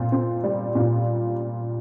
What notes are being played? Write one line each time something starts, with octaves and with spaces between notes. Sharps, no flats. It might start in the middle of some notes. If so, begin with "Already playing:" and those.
Already playing: A#2 C4
C4
G3
A#2